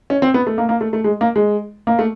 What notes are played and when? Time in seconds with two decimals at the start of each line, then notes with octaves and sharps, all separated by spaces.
0.10 C#4
0.22 C4
0.34 B3
0.47 A3
0.58 A#3
0.69 A#3
0.81 A3
0.93 A3
1.04 G#3
1.21 A#3
1.36 G#3
1.87 A#3
1.99 A3